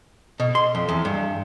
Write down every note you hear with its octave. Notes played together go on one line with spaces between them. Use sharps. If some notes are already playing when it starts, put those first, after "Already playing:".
B2
C6
F2
E2
G2